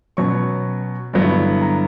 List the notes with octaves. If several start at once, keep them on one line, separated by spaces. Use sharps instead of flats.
B2 F#3 C#4 C#6
G2 D3 F#3 B3 E4
A#5